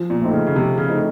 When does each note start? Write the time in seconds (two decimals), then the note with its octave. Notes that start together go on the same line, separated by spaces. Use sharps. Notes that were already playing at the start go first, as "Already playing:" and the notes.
Already playing: F3
0.10 A#2
0.21 A3 C4 D#4
0.33 C#3
0.46 C#3
0.55 C3 F3
0.78 C#3
0.89 A3 C4 D#4